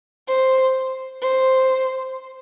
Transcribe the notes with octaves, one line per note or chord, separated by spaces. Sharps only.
C5
C5